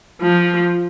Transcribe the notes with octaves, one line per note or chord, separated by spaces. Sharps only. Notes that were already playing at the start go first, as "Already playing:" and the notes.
F3